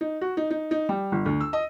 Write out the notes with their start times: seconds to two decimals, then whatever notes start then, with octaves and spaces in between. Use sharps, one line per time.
0.01 D#4
0.21 F#4
0.37 D#4
0.51 D#4
0.71 D#4
0.89 G3
1.12 G1
1.26 D2
1.40 E6
1.53 D#5